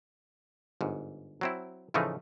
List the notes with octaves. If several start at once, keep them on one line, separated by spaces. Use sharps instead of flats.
G1 G#2
F#3 C4 E4
A2 C#3 E3 F3 A3 D#4